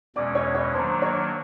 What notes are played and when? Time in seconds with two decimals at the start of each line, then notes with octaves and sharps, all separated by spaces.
0.16 E2 B2 G#3 C#4 D5 D6
0.35 C#5 C#6
0.55 C#5 C#6
0.73 D#3 F#3 A#3 D4 C5 C6
1.02 C#5 C#6